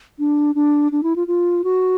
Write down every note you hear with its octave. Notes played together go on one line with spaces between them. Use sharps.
D4
D4
D4
E4
F4
F4
F#4